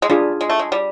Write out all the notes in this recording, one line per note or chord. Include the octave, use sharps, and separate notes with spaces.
G#3
G3 D4 F4 G#4
G#3
A3
G#3
G3